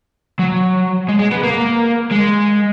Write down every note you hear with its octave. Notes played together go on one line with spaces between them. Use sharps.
F#3
G#3
G#3
B3
A#3
G#3